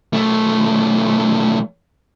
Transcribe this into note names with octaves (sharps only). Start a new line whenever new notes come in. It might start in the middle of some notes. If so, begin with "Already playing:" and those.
B1 A3